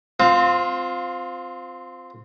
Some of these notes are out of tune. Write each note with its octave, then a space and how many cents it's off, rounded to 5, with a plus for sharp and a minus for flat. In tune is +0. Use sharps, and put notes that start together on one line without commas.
C4 -10 F4 +15